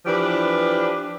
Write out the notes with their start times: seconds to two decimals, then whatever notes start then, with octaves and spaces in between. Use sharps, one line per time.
0.05 E3 F3 D4 G4 B4